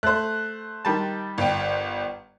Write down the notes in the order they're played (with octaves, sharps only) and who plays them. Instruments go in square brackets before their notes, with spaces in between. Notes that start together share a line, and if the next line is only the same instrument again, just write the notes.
[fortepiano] A3 [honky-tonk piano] C5 F#6
[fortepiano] D#3 G3 A5
[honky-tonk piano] G1 G5